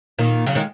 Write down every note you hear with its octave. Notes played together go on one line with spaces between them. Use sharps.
A#2 D#3
C#3 F#3
D#3 G#3